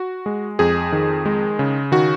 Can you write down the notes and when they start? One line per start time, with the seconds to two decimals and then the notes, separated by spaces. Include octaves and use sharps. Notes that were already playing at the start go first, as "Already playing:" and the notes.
Already playing: F#4
0.26 G#3
0.59 F2 G#4
0.92 D#3
1.26 G#3
1.59 C#3
1.92 D#3 F#4